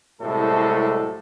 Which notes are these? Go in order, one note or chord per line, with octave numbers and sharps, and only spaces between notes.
C2 A2 C3 F#3 G#3 A4